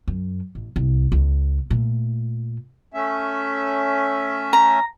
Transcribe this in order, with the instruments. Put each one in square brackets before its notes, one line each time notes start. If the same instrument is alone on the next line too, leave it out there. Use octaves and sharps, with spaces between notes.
[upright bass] F#2
A1
C2
C#2
A#2 A3
[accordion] A3 C#4 E5
[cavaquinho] A#5